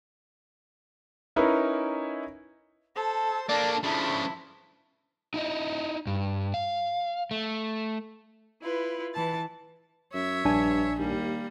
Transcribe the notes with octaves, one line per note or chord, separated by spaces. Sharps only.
C#4 D#4 E4 A#4 B4
A4 C5 A5
A#3 D4 A4 D5
C#3 F3 D4 E4
D#4 E4 D#5
G2
F5
A3
E4 F4 B4
E3 B4 A5 A6
F#2 C#5 E5
A#1 G2 D4 G#5
D#2 G3 A#3